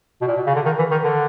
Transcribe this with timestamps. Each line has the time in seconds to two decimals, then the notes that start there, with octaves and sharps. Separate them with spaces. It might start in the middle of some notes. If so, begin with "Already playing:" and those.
0.22 B2
0.27 A#2
0.36 B2
0.46 C#3
0.55 D3
0.65 D#3
0.78 E3
0.91 D#3
1.04 D3